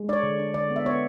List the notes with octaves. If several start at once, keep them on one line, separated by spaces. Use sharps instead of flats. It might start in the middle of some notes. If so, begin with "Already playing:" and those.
Already playing: G#3
D4 C#5 D5
D3
D4
D3 D5
B3
E5
B3 C#5